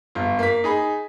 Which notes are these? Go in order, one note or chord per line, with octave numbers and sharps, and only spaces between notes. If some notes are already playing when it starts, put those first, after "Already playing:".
G1 F4
A#3 B6
D#4 G#4 B5